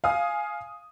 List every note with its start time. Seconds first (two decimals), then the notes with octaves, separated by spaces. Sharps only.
0.04 F5 G#5 D#6